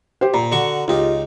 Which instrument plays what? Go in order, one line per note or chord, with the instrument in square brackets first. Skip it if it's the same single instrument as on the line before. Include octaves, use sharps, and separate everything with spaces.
[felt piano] G4 C5
[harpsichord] A#2 [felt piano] A#5
[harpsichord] D3 F#4 C#6
[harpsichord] C#2 D#4 [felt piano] F4 G4